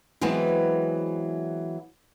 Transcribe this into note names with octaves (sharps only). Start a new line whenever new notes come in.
E3 F#3 G#3 B3 C4